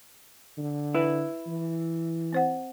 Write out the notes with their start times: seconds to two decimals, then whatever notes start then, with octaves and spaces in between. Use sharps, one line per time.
0.58 D3
0.94 E4 B4
1.47 E3
2.33 C4 C5 F#5